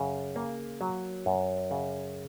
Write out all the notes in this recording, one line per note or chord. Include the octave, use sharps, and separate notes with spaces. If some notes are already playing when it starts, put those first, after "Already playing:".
Already playing: F#2 C#3
A#3
F#3
F#2
C#3